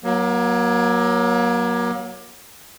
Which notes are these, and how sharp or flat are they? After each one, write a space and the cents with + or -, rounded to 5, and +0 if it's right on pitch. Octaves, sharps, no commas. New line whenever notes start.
F#3 +0 A#3 +35